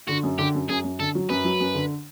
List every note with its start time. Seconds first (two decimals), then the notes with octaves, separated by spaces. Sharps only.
0.08 D3 F#4
0.23 F#2
0.38 D3 G4
0.54 F#2
0.69 F#2 G#4
0.84 F#2
1.00 D3 A4
1.15 F#3
1.29 F#2 B4
1.44 F#3
1.60 F#2
1.75 D3